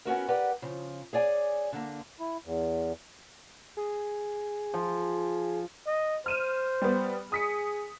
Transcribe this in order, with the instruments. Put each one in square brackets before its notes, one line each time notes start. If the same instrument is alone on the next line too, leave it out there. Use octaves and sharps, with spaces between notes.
[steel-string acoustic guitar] B3 C#4 F#4 A#4
G4 A#4 B4 D5 F#5 G5
C#3 F3
G#4 C#5 D5 G#5
D3 A#3
[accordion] E4
E2
[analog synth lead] G#4
[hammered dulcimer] F3
[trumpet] D#5
[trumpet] C5 [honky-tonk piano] F6 D#7 E7
[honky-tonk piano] G3 B3
[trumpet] G#4 [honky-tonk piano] D#6 B6 C#7